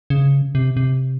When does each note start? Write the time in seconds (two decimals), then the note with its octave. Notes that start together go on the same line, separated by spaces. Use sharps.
0.10 C#3
0.55 C3
0.77 C3